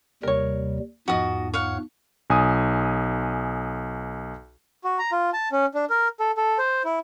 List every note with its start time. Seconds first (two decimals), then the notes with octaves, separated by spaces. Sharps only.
0.23 D#2 C3 G3 A#4 C#5
1.08 E2 G#2 F3 F#4 D#5
1.54 C#5 F5 F#5
2.30 B1 G#5 D#6
4.84 F#4
4.99 A#5
5.12 F4
5.33 A5
5.52 C#4
5.74 D4
5.90 A#4
6.20 A4
6.37 A4
6.58 C5
6.85 E4